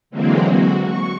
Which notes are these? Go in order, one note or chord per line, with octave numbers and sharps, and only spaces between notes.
D3 E3 F#3 G#3 A#3 C4
F#4
C#6